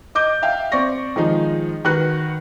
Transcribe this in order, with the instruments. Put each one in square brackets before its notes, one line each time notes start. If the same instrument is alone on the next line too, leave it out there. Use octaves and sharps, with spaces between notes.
[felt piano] D#5 D6 G6
E5 F5 G5
C4 D5 C#6 A#6
D#3 F3 G#3 D#4
D#3 F#4 B4 F#6